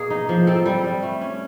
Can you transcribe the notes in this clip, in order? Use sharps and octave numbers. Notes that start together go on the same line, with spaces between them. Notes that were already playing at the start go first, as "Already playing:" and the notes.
Already playing: B2 A#3 G#4
D#4
F3
C4 A4
G3
G3
A3
C#4